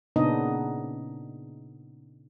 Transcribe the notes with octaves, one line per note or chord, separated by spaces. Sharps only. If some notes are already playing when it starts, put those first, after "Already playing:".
A#2 C#3 B3 D4 D#4 D#5